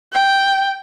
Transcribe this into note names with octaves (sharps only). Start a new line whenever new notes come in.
G5